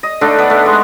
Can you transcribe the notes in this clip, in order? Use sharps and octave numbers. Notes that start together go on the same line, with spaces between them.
D#5
D3 A3 D4 D#4
B3 B4
A3
G#3 C#6